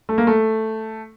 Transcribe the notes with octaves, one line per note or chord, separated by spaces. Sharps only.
A3
A#3
A3